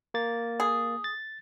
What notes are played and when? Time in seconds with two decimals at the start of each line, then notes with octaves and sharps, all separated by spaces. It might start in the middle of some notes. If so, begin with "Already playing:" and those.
0.14 A#3 A6
0.60 G#4
1.04 A6